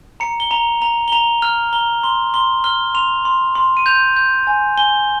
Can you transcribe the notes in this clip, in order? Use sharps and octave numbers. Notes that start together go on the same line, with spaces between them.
A#5 C#7
G7
A#5 F7
A#5 F7
G7
A#5 F7
F6 F7
A#5 G7
C6 G7
C6 G7
F6 G7
C6 F7
C6
C6
D#7
G6 F7
G6
G#5
G#5 G7